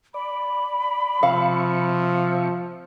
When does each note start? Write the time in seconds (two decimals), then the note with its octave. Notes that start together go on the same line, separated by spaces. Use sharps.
0.14 D5 B5
1.23 C3 F3 E5 F5 C#6